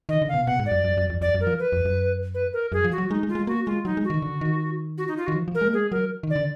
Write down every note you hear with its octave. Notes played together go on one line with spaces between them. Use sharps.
D#3 D#5
D3
F5
B2
B2 F#5
G#2
D5
F#2
F#2
F#2
F2
F2 D5
F#2
A#4
F3
B4
F2
F#2
B4
A#4
F#2 G#4
F3
F#4
F#3
G#3 D#4
G#3
F4
G#3
A#3 F#4
G#3 F4
F#3 D#4
G#3
F#4
D#3
D3
D#3
F#4
D#4
F4
D#3 F#4
F3
F3
A#4
G#3
A#3
G#3 G#4
F#3 A#4
D#3
D5
D3